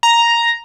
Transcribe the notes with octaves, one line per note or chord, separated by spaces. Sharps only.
A#5